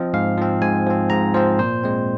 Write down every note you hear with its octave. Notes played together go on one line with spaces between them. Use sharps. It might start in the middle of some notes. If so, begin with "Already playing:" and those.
Already playing: F3 C4 D#5
G#2 F5
F3 C4
G#2 G#5
F3 C4
G#2 A#5
F3 C4 C5
A#2 C5
G#3 C4